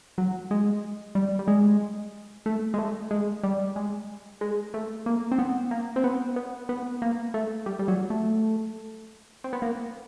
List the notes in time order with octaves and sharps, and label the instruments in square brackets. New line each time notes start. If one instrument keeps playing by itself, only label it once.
[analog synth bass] F#3
G#3
G3
G3
G#3
A3
G#3
A3
G#3
G3
G#3
G#3
A3
A#3
C4
B3
A#3
C4
B3
B3
B3
A#3
A3
G3
G3
F#3
A3
C4
B3
A#3